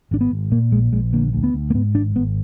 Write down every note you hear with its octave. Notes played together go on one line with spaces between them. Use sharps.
G#1 D4
B3
G#1
A#2 A#3
A#1 G#3
A#1 G#3
D3 A#3
D2
B3
D2
A#3
G#2 B3
G#1 D4
G#1 B3